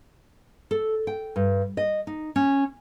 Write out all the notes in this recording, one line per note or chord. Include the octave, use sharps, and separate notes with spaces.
A4
G5
G2
D#5
D#4
C#4